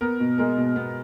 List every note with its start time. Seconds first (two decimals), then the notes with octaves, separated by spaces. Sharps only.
0.01 B3 A#4
0.20 B2
0.38 G#3 A#4
0.57 B2
0.76 B3